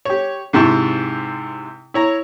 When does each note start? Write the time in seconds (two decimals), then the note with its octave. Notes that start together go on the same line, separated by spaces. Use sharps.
0.05 G4 C#5
0.53 G#2 C3 E4 A5 C#6
1.94 E4 C#5 A#5